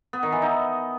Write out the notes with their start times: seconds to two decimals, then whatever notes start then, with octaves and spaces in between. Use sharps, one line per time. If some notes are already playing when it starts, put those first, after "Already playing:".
0.13 B3
0.23 D#3
0.32 E3
0.42 D#4